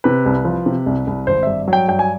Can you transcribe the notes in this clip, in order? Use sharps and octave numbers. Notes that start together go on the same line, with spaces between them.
C3 B4
C2
F3
C3
C2
C2
G#1 C5
G2 E5
F#3
G5
G2 G5
G#5